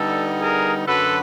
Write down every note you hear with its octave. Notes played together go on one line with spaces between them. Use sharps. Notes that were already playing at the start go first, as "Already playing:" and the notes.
Already playing: D3 G3 B3 D#4 A4
G#4 A#4
F#2 D3 F#3 A4 B4